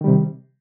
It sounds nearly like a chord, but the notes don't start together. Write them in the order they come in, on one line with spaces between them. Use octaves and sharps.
D#3 G3 C3